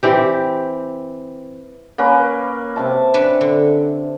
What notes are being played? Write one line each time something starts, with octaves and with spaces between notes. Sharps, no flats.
E3 C4 G4
A#3 C#4 B4
C3 E5 A5
C#4 D4 B4
D3